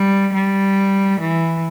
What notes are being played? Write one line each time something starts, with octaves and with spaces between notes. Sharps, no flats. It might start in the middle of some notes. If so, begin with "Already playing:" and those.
Already playing: G3
G3
E3